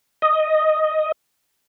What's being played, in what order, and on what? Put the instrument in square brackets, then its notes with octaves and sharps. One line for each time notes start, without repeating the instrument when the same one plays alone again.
[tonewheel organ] D#5